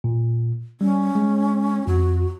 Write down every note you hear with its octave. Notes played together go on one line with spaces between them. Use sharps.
A#2
G3 C#4
G#3
F2 F#4